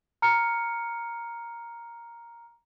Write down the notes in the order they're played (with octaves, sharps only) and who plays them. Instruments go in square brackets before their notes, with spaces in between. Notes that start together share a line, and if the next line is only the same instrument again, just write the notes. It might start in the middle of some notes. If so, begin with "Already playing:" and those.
[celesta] A#5 F6 C#7